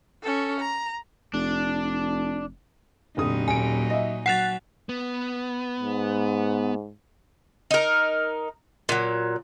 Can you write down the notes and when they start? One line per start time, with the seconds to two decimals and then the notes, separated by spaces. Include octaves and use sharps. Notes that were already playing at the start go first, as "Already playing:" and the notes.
0.23 C#4 A4
0.60 A#5
1.34 F1 D4
3.17 F1 A#2 D3 F#3 D#4 D#6
3.48 D#1 G#5 D7
3.90 D#5 E5
4.26 F#3 F#5 F#6 A6 C7 E7 F7
4.89 B3
5.80 G#2
7.71 D#4 A#4
8.89 A#2 F#3